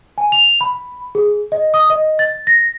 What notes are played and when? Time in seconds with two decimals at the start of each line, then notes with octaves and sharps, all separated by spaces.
0.18 G#5
0.32 F7
0.61 B5
1.15 G#4
1.52 D#5
1.74 D#6
1.90 D#5
2.19 A6
2.47 A#6